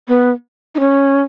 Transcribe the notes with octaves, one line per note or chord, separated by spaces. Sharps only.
B3
D#4
C#4